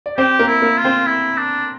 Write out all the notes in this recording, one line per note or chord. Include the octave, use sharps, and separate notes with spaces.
D5
C4 G4 C5
A#3 A#4
E4
A#3 A#4
F4
C4 C5
E4
D4